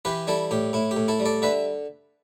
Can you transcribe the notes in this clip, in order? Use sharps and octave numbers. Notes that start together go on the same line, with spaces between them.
E3 G4 B4
G3 E4 A4
A2 G4
A2 E4
G4
A2
E4 A4
G3
A4 D5
D3 B4 E5